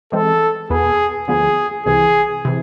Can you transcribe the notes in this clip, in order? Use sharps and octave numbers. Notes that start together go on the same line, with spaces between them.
E3 G#3 C4 A4
E2 B2 B3 G#4
D2 D3 F3 B3 G#4
C2 C3 E3 G#4
C3 E3